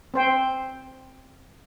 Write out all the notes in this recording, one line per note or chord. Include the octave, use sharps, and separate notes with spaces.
C4 C5 G5